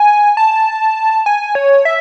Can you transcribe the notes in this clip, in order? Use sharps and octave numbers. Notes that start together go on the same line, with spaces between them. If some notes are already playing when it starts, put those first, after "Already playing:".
Already playing: G#5
A5
G#5
C#5
E5